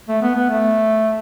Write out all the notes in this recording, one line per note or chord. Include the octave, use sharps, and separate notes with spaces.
A3
B3
B3
A3